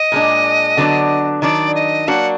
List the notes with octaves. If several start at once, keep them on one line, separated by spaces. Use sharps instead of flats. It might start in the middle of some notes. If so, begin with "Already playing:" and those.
Already playing: D#5
A#2 G#3 D4
D3 F#3 B3 D4
D#3 F#3 D4 D5
D#5
F#3 A#3 D4 F#4 F#5